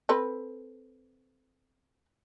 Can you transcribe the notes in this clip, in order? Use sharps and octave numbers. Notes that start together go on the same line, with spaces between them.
C4 A4 B4